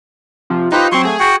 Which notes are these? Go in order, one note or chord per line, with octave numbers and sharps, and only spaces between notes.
C3 F3
D#4 F4 G4 B4 C5
F#3 C4 C6 C#6
A3 G#4
F#4 F#5 G5